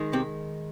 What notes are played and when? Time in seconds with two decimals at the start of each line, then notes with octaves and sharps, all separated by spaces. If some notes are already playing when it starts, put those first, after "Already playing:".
Already playing: D#3 G#3
0.13 C3 C4